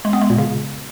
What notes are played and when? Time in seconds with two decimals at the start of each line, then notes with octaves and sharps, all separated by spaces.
0.05 G#3
0.13 B3
0.21 G#3
0.30 A#2
0.38 C#3